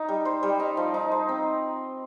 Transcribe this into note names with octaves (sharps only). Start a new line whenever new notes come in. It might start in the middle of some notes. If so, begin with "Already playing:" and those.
Already playing: D#4
G3
C5
G3
D#4
F3
D#4
C5
C4